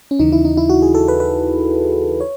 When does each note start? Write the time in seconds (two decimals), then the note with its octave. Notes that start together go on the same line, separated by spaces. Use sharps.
0.11 C#4
0.19 D#2 C#3 E3 D#4
0.32 E4
0.45 D#4
0.57 E4
0.69 F#4
0.82 G#4
0.95 A4
1.08 B4
1.20 B4
2.20 C#5